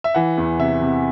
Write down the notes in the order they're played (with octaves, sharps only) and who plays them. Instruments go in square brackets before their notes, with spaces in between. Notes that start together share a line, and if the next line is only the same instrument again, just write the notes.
[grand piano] E5
E3 F#5
E2
C3 E5
C3